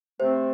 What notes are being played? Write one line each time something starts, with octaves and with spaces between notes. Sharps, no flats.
C3 A3 C4 C5